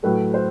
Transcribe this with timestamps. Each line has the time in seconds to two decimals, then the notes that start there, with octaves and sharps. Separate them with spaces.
0.03 A2 F#3 A3 B4
0.34 C5